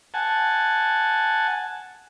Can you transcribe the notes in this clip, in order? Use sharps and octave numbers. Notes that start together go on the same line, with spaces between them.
F#5 G#5 A5